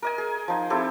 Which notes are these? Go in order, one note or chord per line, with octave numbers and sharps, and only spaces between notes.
A#4 D#5 G#5
G#4
F3 D#4
C4 E4 G4 A4